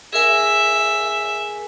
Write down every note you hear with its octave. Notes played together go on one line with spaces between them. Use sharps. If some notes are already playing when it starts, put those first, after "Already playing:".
G#4 A#4 E5 G#5